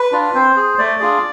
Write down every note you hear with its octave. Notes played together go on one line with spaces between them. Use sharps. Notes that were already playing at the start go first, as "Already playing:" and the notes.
Already playing: B4
D4 F4
C4 C5
G#4
A3 D5
D4 F4 G#4